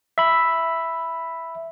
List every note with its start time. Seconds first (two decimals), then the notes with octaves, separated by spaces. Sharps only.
0.18 E5 B5